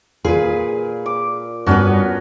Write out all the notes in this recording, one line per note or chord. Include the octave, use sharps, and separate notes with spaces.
A#2 G#4 B4
D6
G2 B3 C#4 F#4 B4